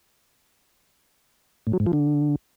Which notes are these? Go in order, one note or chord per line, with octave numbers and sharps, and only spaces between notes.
A2
F#3
G#2
F3
D3